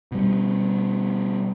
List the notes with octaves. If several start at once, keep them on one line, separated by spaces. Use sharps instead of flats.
B2 G3